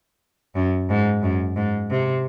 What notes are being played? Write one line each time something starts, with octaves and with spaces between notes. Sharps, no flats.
F#2
G#2
F#2
G#2
C3